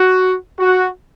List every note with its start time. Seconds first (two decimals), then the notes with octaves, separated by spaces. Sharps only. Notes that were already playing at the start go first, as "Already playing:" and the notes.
Already playing: F#4
0.58 F#4